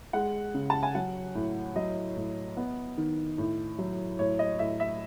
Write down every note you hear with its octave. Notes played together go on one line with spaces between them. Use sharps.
G#3 F#5
C#3
A5
G#5
F#3 F#5
A2
F#3 D#5
A2
B3
D#3
A2
F#3
A2 C#5
D#5
A2 E5
E5